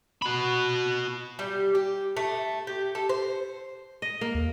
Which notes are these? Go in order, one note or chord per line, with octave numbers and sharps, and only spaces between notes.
F#4 B5
G3
G4
A3
G4
A4
C5
D#5
A#3
D#2